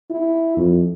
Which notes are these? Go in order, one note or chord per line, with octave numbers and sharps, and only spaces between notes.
E4
F2